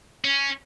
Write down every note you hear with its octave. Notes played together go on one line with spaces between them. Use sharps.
C#4